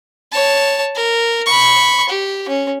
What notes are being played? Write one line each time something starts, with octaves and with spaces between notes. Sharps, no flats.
C#5 A5
A#4
B5 C#6
G4
C#4